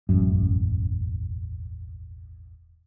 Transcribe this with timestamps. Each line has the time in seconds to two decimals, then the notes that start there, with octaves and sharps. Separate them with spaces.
0.09 E1 A1 F#2